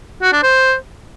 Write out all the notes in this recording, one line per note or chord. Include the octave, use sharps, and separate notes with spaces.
F#4
D4
C5